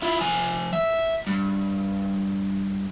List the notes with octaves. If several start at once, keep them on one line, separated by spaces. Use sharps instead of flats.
E4 F4
F3 G#5
E5
G2